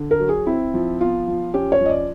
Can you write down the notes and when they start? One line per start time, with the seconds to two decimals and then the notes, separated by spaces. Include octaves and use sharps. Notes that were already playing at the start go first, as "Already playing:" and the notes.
Already playing: D3
0.11 A#4
0.20 F#3
0.29 G#4
0.46 C4 E4
0.74 F3
1.00 B3 F4
1.28 F3
1.54 C#4 G4
1.72 C#5
1.81 F3 D#5
1.90 D5